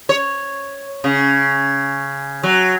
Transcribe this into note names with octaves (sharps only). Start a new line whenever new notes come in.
C#5
C#3
F#3